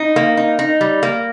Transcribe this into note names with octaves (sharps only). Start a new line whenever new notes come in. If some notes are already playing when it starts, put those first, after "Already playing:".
Already playing: D#4
A#3
D#4
D#4
G3
A#3